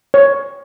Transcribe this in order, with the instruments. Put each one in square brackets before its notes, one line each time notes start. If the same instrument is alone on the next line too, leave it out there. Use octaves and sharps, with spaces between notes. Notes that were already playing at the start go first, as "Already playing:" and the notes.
[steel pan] C#5